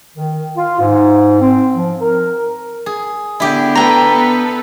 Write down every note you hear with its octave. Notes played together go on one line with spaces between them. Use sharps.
D#3
F4
G#2
C4
F3
A#4
G#4
D3 B3 E4 G4
A4 B4 G5 A#5
B3